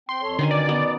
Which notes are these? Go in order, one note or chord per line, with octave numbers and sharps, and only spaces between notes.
C4 G5 C6
F2 A4 C#5
B2 D3 D#3 C#4 G#5 A#5
D5
B3